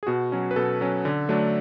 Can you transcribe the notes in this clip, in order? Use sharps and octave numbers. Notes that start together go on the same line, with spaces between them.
G#4
B2 F#4
F#3 C#4
B4
B2 A4
F#3 C#4
D3
F#3 A3 D4